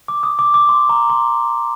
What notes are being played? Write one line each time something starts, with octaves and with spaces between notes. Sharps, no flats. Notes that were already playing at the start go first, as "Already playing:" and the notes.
D6
D#6
D6
D6
C6
A#5
C6